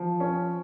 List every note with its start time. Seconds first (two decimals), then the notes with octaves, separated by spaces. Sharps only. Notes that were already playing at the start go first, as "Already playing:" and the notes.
Already playing: F3
0.20 C#4